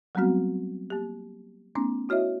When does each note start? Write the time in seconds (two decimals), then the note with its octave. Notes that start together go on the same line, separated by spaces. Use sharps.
0.15 F#3 G3 A3 B3 C4 F#4
0.90 A#3 G4
1.75 A3 B3 C#4 D#4
2.09 E4 F#4 C#5 D#5 E5